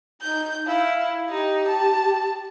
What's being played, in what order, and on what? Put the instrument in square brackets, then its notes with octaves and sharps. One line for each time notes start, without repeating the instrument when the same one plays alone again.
[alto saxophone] D#4 [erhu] G6
[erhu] E4 [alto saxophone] F5
[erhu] D#4 [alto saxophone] G4
[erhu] A5